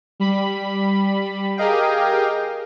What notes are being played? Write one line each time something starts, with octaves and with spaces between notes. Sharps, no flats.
G3 B5
G4 G#4 A#4 D#5 F5 G5